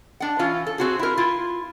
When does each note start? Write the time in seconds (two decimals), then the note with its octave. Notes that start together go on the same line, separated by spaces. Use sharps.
0.20 D4 F#5
0.39 E3 C#4 F4
0.67 A4
0.78 C4 F#4 G#4
0.99 E4 A#4
1.18 E4 F4